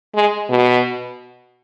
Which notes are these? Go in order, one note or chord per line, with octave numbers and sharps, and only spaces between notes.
G#3
B2